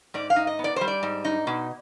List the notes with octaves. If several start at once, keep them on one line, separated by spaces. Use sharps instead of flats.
G#2 D5
F5
D#4
D#5
B3
D5
G3 C5
D5
G#2
D#4
B2